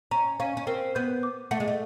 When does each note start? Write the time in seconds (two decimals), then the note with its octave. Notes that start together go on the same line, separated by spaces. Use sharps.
0.11 C#4 A#5
0.40 C#4 F5
0.57 C#4
0.67 C4 A#4
0.95 B3 G6
1.23 D6
1.51 A3 F#5
1.60 G#3
1.68 A3